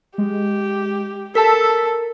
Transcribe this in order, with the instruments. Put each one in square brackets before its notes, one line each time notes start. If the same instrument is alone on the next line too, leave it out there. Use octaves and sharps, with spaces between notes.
[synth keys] G#3 [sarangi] G4
[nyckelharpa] A4 [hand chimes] A#4 [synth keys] A5 E6 B6